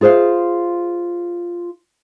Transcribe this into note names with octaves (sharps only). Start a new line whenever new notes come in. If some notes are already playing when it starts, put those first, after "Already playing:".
F4 G#4 C5 D#5 F5